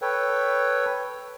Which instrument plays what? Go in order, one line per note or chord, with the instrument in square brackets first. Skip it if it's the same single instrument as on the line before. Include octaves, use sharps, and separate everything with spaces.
[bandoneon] A4 B4 C#5 G5